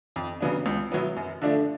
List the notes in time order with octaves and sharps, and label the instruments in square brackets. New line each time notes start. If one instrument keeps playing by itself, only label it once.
[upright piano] F2
C#3 F#3 B3 D4
C#2
B2 F#3 B3 E4
F#2
D3 F3 A3 D4